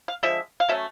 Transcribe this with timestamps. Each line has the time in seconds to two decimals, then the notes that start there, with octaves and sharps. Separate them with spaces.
0.08 F5
0.23 D3 F3 G#3 E5
0.60 F5
0.69 F#3 A3 C#4 E5